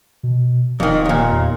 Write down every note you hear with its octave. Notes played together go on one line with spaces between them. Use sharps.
B2
D1 F2 D#3
D#2 A#2
E2